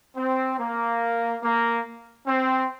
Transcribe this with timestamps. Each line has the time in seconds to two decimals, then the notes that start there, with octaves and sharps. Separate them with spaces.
0.17 C4
0.59 A#3
1.43 A#3
2.27 C4